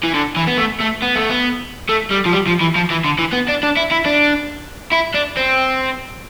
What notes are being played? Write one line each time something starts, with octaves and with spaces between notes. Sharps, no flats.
E3
D3
E3
B3
A3
A3
B3
A3
B3
A3
G3
F3
G3
F3
E3
F3
E3
D3
E3
B3
D4
D4
E4
E4
D4
E4
D4
C4